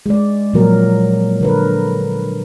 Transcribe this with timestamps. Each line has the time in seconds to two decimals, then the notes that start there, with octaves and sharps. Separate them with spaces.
0.06 G#3 D5
0.53 A#2 F3 F#3 A#4
1.41 D3 A#4 B4